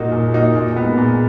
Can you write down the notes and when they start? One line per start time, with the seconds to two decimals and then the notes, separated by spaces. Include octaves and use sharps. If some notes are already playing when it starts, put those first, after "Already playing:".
Already playing: A#2 A#3 D#4 F#4
0.12 A#2
0.34 A#3 D#4 F#4
0.55 A#2
0.76 G#3 B3
0.97 A#2